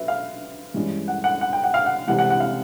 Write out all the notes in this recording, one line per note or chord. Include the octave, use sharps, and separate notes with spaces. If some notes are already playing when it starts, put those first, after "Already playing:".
Already playing: F#3 B4 E5
F5
G2 E3 G#3 C#4
F#5
F#5
F#5
G5
F#5
F5
F#5
C2 C3 E3 G#3 F#5
F#5
F#5
F5